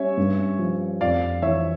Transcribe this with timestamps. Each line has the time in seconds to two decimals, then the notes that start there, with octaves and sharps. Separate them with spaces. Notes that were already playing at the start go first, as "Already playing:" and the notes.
Already playing: G3 C#4 C#5 E5
0.17 G2
0.59 F3
1.01 F2 D5 F5
1.42 E3 C#5 E5